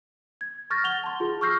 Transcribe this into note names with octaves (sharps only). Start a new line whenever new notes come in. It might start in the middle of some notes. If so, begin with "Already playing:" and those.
G#6
C#6 F6 G6 A6 A#6
F#5 F7 G7
A5 C6
F4 G#4
C#6 E6 F6 G6 A#6 C7